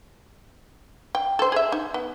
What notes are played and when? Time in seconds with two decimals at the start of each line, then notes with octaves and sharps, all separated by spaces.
1.15 G5
1.39 A4 C5
1.52 G#4 E5
1.72 D#4
1.94 B3